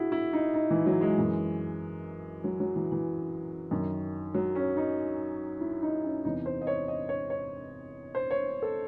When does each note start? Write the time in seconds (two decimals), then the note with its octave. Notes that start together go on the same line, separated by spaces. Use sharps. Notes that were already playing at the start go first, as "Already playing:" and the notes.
Already playing: E4 F#4 G#4
0.12 E4
0.33 D#4
0.54 D#4
0.70 E3
0.86 F#3
1.01 G#3
1.18 F#2 E3
2.44 F#3
2.60 F#3
2.76 E3
2.92 E3
3.71 F#2 D#3
4.34 F#3
4.55 C#4
4.77 D#4
5.61 E4
5.82 D#4
6.03 C#4
6.25 E2 C3 E3 D#4
6.46 C5
6.62 D#5
6.67 C#5
6.88 D#5
7.09 C#5
7.30 C#5
8.15 C5
8.31 C#5
8.62 A4